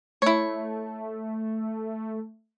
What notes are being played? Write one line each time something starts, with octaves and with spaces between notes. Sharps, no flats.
A3 E4 C#5